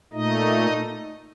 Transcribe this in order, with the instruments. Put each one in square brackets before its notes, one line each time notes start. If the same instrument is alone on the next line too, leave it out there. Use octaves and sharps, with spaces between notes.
[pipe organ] A#2 A3 D#4 D#5